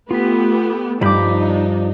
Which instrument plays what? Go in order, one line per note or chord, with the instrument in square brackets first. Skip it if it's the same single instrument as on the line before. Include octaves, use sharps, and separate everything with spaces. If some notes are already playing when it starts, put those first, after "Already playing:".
[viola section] A3 B3 G4 [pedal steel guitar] F4 B5
[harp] G2 D6 [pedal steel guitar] F3 B5 G6 [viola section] D4 D#4